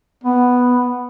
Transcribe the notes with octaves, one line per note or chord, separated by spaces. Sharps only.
B3